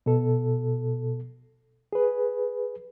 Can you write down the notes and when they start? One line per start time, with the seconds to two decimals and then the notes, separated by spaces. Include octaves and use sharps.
0.06 B2 A4
1.93 G#4 B4